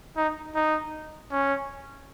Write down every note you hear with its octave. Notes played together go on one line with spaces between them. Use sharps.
D#4
D#4
C#4